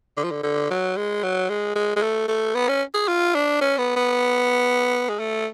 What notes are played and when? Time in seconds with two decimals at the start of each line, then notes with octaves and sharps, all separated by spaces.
0.17 D3
0.24 F3
0.31 D3
0.43 D3
0.70 F#3
0.97 G#3
1.23 F#3
1.50 G#3
1.76 G#3
1.96 G#3
2.02 A3
2.28 A3
2.55 B3
2.69 C#4
2.94 G#4
3.08 F4
3.35 D4
3.61 C#4
3.78 B3
3.96 B3
5.09 G#3
5.19 A3